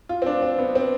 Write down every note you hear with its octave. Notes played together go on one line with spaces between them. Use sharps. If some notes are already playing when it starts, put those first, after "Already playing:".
F4
C4
D4
C4
B3
C4